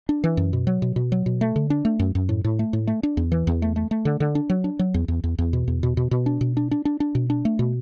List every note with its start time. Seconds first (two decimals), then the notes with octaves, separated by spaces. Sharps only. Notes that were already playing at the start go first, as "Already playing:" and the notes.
0.09 D4
0.24 E3
0.37 F#2
0.53 B2
0.67 F#3
0.82 B2
0.96 B2
1.12 F#3
1.26 B2
1.41 A3
1.56 D3
1.70 D4
1.85 A3
1.99 F#2
2.15 F#2
2.29 A2
2.44 A2
2.59 A3
2.73 A2
2.87 A3
3.03 D4
3.17 E2
3.32 E3
3.47 E2
3.62 A3
3.76 A3
3.91 A3
4.05 D3
4.20 D3
4.35 D4
4.50 F#3
4.64 D4
4.79 F#3
4.94 E2
5.08 E2
5.24 E2
5.38 E2
5.53 B2
5.68 E2
5.83 B2
5.97 B2
6.11 B2
6.26 D4
6.41 B2
6.57 D4
6.71 D4
6.85 D4
7.00 D4
7.15 B2
7.30 D4
7.45 A3
7.59 B2